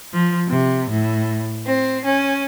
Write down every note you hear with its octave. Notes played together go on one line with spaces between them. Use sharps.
F3
C3
A2
C4
C#4